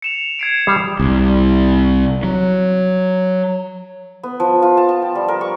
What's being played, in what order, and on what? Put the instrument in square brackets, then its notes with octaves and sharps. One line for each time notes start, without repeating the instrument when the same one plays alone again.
[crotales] C#7 E7 F7
G#6 C7 D7
[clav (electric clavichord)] G3 [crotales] D#6 C7
[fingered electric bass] C2
F#3
[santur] B3
F3
F4
A5
A5
G5
G3
A#4
C#6